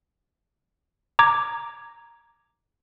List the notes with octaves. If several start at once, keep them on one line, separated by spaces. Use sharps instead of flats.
A#5 D6 G#6